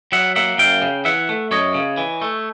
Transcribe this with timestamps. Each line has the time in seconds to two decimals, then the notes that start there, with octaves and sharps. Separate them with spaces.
0.12 F#3 E5 F#5
0.36 A#3 E5 F#5
0.58 F#2 F5 G5
0.82 C#3
1.05 E3 E5 F#5
1.29 A3
1.51 F#2 C#5 D#5
1.74 C#3
1.98 E3
2.22 A3